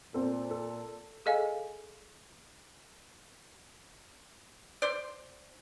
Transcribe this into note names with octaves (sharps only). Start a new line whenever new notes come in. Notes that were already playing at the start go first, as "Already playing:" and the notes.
A#2 C4 A4
A4
G#4 A4 D#5 F5 G#5
C5 D5